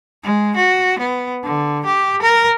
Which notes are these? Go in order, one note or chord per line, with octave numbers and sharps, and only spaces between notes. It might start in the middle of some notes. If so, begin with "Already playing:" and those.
G#3
F#4
B3
D3
G4
A#4